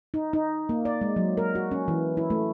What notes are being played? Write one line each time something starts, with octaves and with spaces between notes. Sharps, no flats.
D#4
D#4
A#3
D5
G#3
F#3
A#4
F#4
C#4
E3
E4
A3